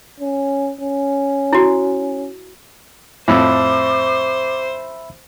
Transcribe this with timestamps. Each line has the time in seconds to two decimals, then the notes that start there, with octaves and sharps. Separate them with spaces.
0.20 C#4
0.81 C#4
1.53 E4 F#4
3.28 F2 A2 C5 E5 B5 D6 E6